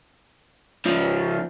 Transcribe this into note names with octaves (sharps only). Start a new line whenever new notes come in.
C#2 F3